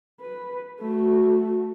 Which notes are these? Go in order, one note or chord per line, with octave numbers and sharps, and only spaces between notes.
B4
A3 F#4